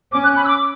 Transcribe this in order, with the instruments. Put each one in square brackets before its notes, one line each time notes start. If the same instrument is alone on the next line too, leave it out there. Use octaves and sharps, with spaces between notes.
[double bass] C#4 [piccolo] D6
[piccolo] F#6
B5
E6
D6